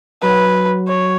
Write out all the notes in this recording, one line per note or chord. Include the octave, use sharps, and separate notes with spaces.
F#3 B4
C#5